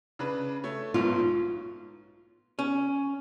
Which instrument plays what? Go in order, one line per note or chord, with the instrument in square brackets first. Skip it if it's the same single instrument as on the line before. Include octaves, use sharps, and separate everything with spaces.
[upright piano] C#3 D4 B4
A3 C#5
[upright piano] B1 G#2 B2 [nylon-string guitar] F4
[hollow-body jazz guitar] C#4